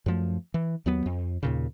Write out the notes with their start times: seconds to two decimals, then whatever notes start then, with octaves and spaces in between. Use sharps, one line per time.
0.06 F#2 F3 A3
0.54 E3
0.86 D#2 F#3 B3
1.06 F2
1.43 D#2 A#2 C#3